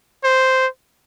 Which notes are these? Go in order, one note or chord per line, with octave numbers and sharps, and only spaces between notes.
C5